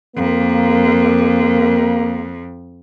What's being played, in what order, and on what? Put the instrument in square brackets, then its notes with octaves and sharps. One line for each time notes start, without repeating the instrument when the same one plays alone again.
[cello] F2 [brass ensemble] A#3